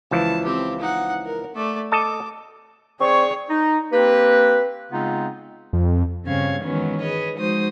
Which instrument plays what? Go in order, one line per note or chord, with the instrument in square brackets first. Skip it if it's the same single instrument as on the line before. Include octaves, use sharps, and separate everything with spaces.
[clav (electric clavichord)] C#2 E3 F3 [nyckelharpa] A5
[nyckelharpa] C4 G4
D#4 F#5
A#4
A3 D5
[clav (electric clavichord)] A4 D#5 A5 [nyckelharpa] D6
[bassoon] C4 [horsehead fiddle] G#4 C#5 [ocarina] D5 [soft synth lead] C#6
[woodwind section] D#4
A#3 C4 G4 B4
C#3 G#3 B3 C4 D#4 F4
[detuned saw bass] F2
[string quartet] G2 C#3 C4 C#4 F5 G#6
D#3 E3 F#3 G#3 B3 C#4
G#4 B4 C#5 D#5
F3 G#3 D#4 F#4 C5 D#6